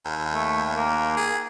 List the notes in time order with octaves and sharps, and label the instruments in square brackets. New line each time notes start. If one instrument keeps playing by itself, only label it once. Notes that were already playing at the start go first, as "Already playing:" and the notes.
[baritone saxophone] D#2
[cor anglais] A3
A#3
[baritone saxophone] G#4